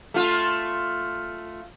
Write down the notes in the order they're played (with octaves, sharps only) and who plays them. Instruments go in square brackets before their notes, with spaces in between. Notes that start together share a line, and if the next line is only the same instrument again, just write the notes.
[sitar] A3 F4